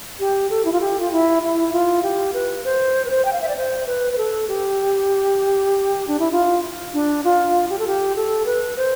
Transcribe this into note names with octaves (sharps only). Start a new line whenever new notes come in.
G4
A4
E4
F4
G4
F4
E4
E4
F4
G4
B4
C5
B4
C5
G5
F5
E5
D5
C5
B4
B4
A4
G4
D4
E4
F4
D4
F4
G4
A4
G4
A4
B4
C5